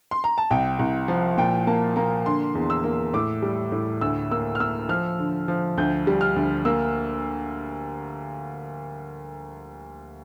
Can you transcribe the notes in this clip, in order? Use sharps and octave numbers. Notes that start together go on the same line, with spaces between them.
C6
A#5
A5
C2 G5
C2
F3
A#2 G5
A#3 A5
A#3 A#5
D3 C6
E2
E6
A#3
A2 D6
G3
A2
D2 E6
A#3 E6
F6
A#3 E6
F3 F6
D3
F3
D2 G6
G3
F6
D2
A#3 E6